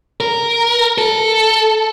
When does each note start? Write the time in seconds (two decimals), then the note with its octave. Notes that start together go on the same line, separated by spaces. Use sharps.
0.20 A#4
0.98 A4